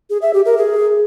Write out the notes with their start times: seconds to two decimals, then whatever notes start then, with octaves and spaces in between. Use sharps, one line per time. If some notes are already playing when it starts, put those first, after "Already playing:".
0.10 G#4
0.22 E5
0.34 G4
0.46 A#4
0.57 G#4